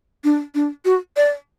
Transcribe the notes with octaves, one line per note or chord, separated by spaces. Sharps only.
D4
D4
F#4
D5